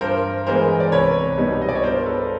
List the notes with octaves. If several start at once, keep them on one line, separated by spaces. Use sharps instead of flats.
G2 A#4 C5
E3 G#3 B3 A#4 C5
D5
C2 B4 C#5
B2 G3 B3 D#4
D#5
D5
C#5
G2 A#4 C5
A4 B4